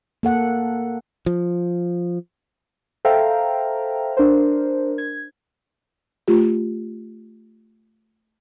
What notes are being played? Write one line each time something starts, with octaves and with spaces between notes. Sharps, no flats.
A#3 A4 F#5
F3
A4 C5 E5 F5 G5 A#5
D4 A#4 C5
G#6
A3 F4 G4